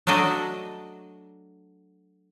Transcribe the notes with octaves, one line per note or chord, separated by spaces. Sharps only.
F#3 A3 D4 F#4 D#5